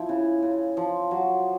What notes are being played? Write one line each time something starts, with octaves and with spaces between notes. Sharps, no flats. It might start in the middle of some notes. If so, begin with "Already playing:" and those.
Already playing: F3 E4
C#3
C#3
F3
F#3